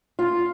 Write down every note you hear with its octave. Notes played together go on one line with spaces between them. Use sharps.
F4